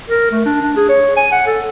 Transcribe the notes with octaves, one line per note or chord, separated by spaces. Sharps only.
A#4
A3
D4
D4
G#4
C#5
G#5
F#5
A4